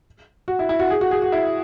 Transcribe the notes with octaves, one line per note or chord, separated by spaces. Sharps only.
F#4
E4
E4
F#4
G#4
F#4
G#4
F#4
E4